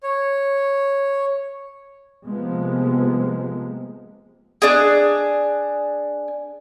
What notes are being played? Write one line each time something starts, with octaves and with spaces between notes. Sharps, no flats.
C#5
C3 F3 G#3 A#3 B3
D4 G#4